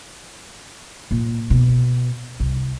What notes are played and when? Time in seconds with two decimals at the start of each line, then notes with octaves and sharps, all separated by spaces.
1.11 A#2
1.50 B2
2.40 C2